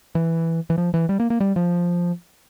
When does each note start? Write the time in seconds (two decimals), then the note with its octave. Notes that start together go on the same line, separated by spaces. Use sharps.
0.15 E3
0.70 E3
0.78 F3
0.94 E3
1.09 G3
1.20 A#3
1.30 A#3
1.40 G3
1.56 F3